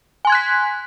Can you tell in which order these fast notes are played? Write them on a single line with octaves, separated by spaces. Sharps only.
G#5 C6 G#6 F#6 B6